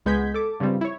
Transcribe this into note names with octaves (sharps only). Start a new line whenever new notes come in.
C#2 G#3 B3 G6 G#6 B6
A4 D6
G2 C#3 F3 G3 C4
E4 C#5